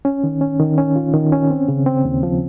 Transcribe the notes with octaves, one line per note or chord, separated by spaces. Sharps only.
C#4
D#3
C#4
D#3
C#4
F4
D#3
C#4
C4
C#3
C4
D#2
F3